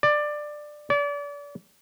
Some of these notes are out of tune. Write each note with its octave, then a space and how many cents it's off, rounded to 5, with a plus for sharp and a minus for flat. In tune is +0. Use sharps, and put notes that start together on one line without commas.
D5 +15
D5 -35